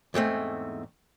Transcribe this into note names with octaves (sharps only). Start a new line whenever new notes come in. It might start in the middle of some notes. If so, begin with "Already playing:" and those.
E2 G#2 A3 C4